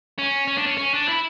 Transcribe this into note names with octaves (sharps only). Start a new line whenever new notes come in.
C#4
C#4
D4
C#4
C#4
D4
E4